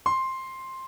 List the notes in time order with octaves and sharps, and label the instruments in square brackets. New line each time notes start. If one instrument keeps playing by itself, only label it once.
[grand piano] C6